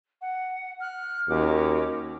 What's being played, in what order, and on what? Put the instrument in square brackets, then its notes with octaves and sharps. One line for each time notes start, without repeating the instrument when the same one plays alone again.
[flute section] F#5
F6 F#6
[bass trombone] D#2 [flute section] C#4 F#4 D6